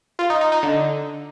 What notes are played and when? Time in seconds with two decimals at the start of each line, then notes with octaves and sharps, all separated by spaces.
0.19 F4
0.30 D#4
0.41 D#4
0.52 D#4
0.63 D3